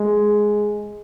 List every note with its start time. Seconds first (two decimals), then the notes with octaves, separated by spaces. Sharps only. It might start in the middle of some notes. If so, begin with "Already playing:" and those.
Already playing: G#3